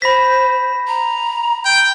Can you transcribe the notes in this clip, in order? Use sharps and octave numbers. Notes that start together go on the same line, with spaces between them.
C5 B5 A#6 B6
A#5
G5